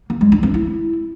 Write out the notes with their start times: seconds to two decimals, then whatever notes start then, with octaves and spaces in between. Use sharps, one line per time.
0.10 A#3
0.21 G#3
0.32 D4
0.43 C4
0.54 E4